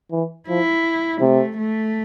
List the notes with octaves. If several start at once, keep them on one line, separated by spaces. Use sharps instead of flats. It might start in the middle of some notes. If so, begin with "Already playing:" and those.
E3
F3 E4
C3 A3
A3